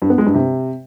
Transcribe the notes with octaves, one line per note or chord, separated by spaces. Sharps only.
G2
B3
G#3
G2
C3